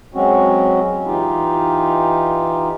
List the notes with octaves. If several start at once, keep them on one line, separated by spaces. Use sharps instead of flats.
F#3 G#3 C4 C#4 F#4
E3 D#4 F4 G4